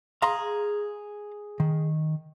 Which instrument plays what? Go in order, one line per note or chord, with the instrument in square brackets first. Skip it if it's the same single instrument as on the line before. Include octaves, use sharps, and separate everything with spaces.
[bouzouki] G#4 [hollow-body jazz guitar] F5 A#5 C6
[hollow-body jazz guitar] D#3